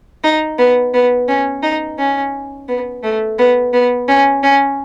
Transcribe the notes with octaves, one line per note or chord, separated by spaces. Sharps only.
D#4
B3
B3
C#4
D#4
C#4
B3
A3
B3
B3
C#4
C#4